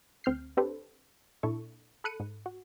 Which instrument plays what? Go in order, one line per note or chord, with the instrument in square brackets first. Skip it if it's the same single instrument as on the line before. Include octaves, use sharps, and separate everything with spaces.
[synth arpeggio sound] D2 C4 F6 G6 C7
C4 D4 G4 A4 B4 C5
A#2 D4 E4 A4 C#6
A4 B5 F#6 C#7 D#7
G#2
F#4